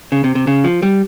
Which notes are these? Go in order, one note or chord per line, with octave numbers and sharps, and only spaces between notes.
C#3
C3
C3
C#3
F3
G3